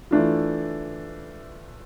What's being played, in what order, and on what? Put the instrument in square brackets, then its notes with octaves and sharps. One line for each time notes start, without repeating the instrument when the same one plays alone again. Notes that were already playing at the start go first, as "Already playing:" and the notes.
[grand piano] E3 A3 D4 F4